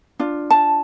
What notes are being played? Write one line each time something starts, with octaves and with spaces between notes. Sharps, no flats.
D4 F4
A5